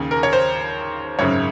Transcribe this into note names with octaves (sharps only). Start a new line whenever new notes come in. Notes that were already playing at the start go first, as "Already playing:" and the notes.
Already playing: D#2 C#3
A#4
C#5
C5
G#1 F#2 C#3 C#5